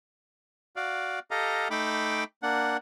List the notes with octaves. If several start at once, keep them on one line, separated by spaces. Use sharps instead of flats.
F#4 D5 F5
G4 A4 D#5 F5 A#5
A3 D#4 G5 B5 D6
A#3 D4 F#5